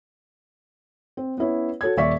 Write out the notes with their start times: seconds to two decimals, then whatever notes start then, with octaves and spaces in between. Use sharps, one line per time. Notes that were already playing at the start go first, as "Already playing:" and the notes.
1.17 C4
1.38 B3 C#4 E4 C#5
1.81 F#4 A4 C#5 G#6
1.97 D#1 D5 E5 C#6 B6